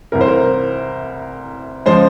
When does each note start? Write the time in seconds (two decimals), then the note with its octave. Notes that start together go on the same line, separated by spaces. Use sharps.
0.12 C2 C3 E3 A#4
0.21 C5
0.28 A#4
1.86 C#3 F3 G#3 C5